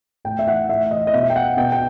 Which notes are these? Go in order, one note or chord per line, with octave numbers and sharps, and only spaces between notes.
A2 G5
E5
E3 F#5
A2 E5
E3 D#5
D#5
B2 E5
G5
F#5
B2 G5
G5